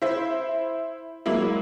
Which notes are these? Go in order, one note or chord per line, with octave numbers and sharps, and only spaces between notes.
E4 C5 E5
F#3 G#3 A#3 E4